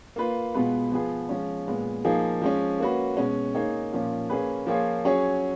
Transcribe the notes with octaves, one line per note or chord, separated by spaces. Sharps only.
A#3 F4 B4
B2 G#3 B3 F4 B4
F3 B3 F4 G#4 B4
F3 G#3 C#4
A#2 G#3 B3
F3 A#3 D#4 G#4
F3 G#3 C#4
A#3 C#4 F#4 B4
B2 G#3 C#4
A#3 D#4 G#4 C#5
A#2 F3 A#3 C#4
A#3 C#4 G#4 B4
F3 A#3 F4 G#4 C#5
F#3 C#4 G#4 C#5